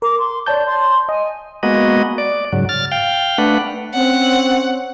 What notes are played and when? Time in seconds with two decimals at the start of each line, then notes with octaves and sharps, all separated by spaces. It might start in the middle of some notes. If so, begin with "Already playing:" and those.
0.02 A#4 D6
0.18 C6
0.46 C#5 D5 A5 G6
0.65 C6
1.09 D#5 G#5
1.63 G#3 A#3 B3 F#4 D#5
2.18 D5
2.53 G#2 C#3 F#3
2.69 F6 A6
2.91 F5 G5
3.38 A3 D4 B4 F#5
3.94 C4 C#4 C5 F#5